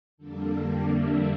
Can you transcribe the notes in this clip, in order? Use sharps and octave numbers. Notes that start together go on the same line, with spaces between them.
F2 D3 G3 A#3 D4 A4
G4
E5